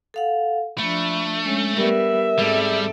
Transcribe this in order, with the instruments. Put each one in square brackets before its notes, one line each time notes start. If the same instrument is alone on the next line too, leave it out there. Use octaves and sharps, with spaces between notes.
[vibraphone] A4 F5 F#5
[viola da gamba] F3 D4 [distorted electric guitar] A3 [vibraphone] B5
[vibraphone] G#3 [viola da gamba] C#4
[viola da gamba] G3 B3 [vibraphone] A#4 [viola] E5
[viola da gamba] G#2 C4 A4 [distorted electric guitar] G3 [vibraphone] G#4